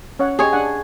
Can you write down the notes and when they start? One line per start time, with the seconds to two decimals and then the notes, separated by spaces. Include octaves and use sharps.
0.19 C#4 C#5 F#5
0.39 G4 G#4 C#5 D#5
0.51 D4 F#5 G#5